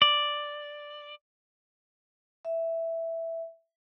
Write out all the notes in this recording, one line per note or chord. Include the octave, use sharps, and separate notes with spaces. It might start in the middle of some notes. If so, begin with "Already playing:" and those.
D5
E5